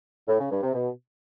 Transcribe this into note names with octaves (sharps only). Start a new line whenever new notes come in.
A2
C#3
G2
C3
B2